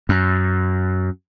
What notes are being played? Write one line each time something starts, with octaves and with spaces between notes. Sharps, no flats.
F#2